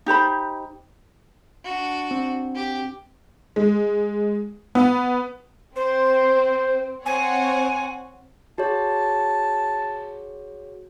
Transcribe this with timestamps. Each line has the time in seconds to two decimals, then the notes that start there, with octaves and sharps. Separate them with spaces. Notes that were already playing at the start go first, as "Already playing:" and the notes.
0.06 D#4 G4 C5 B5
1.64 D4 F#4
2.11 C4
2.55 G4
3.56 G#3
4.75 B3
5.75 C4 C5
7.05 C4 C#5 F#5 G#5
8.58 F#4 G#4 C#5 A5